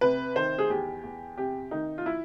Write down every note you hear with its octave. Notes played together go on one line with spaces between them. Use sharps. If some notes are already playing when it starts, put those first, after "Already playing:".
C3 B4
D#3 C5
G#4
E2 G4
E2
C3 G4
D#3 D#4
F4
E4